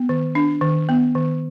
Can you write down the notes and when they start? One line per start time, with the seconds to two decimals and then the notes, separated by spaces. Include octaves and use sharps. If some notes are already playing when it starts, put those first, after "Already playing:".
Already playing: B3
0.09 D#3
0.35 D4
0.61 D#3
0.89 B3
1.15 D#3